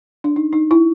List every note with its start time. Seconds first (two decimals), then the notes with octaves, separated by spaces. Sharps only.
0.24 D4
0.36 D#4
0.53 D#4
0.71 E4